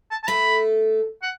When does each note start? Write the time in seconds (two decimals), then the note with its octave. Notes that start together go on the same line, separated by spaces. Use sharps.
0.11 A5
0.23 A5
0.27 A3 A4 B5
1.22 F#5